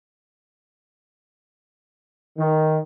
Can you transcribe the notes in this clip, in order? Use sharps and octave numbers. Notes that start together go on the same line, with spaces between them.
D#3